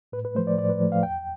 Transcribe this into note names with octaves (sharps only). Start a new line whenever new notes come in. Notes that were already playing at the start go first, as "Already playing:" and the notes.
A2 B4
B4
F3 A3 C5
D5
A2 D5
B4
F3 A3
F5
E2 G5